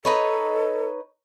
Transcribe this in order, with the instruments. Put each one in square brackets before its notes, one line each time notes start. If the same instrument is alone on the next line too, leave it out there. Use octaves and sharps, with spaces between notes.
[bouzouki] D#4 B4 C#5 [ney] A4